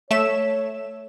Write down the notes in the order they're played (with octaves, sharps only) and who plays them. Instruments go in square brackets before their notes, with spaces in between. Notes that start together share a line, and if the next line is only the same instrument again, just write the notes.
[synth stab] A3 E5 E7 [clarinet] C#5